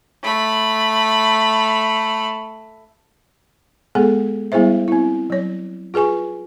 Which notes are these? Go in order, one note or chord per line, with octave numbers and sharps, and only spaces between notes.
A3 B5
G#3 B3 G#4 A4 F#5
G3 B3 E4 G#4 C5 E5
C4 E4
F#3 C#5
F4 G#4 B4 G#5 C#6